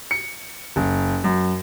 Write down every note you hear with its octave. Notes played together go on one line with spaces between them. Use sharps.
C#7
F#1
F#2